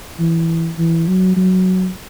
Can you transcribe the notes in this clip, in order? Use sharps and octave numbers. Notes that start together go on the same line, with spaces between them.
E3
E3
F#3
F#3